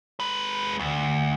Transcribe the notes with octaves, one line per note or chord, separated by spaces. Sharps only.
G#3 B4
D2